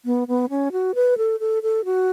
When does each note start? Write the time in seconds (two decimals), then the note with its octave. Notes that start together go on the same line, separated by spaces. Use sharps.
0.05 B3
0.28 B3
0.50 C#4
0.72 F#4
0.95 B4
1.18 A4
1.40 A4
1.63 A4
1.85 F#4